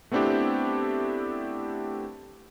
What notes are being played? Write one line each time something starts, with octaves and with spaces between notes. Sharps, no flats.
A3 B3 C4 D4 E4 G4